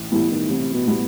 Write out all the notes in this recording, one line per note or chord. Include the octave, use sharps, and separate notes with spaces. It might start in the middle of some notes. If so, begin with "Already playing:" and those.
Already playing: A1 A2
A2 E3 G3 B3
D#3
A1 C3
B2
A2 G3 B3